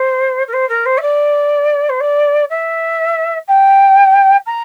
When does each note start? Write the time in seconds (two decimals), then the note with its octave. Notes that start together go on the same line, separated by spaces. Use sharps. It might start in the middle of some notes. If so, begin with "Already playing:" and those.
Already playing: C5
0.47 A#4
0.53 C5
0.69 A#4
0.85 C5
0.98 E5
1.02 D5
1.89 C5
2.00 D5
2.49 E5
3.48 G5
4.46 A#5